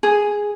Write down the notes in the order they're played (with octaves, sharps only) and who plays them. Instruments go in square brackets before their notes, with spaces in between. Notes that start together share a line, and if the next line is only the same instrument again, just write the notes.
[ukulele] G#4